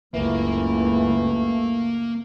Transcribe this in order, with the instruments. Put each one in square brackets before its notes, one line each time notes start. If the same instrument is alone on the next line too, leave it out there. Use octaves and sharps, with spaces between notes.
[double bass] F#1 C#2 [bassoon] E3 [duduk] A3 [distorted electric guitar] A#3